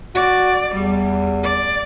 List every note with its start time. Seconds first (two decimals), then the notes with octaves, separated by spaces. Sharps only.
0.15 F#4 D5
0.74 E2 G3
1.43 D5